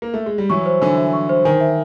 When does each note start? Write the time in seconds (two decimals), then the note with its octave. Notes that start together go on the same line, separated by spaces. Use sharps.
0.02 A#3
0.14 A3
0.26 G#3
0.38 G3
0.50 E3 F#3 C#6
0.66 C5
0.81 D3 E3 G#5
0.98 E5
1.13 C#6
1.29 C5
1.45 D#3 G#5
1.61 E5